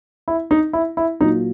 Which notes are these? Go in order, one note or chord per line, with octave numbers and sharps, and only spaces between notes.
E4
D#4
E4
E4
A#2 F#3 D#4